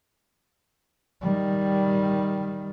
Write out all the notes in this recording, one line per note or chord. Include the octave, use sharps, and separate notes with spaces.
D#3 G3